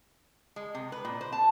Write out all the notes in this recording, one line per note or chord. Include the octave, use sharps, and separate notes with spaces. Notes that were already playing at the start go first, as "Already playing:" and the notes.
G#3
C3
B4
A#2
C5
A5